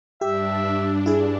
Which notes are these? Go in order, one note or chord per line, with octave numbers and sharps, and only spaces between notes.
G2 D4 G4 E5
E4 G#4